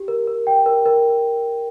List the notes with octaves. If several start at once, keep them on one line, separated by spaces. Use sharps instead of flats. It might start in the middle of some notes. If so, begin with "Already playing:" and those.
Already playing: G4
A#4
A#4
G5
A#4
A#4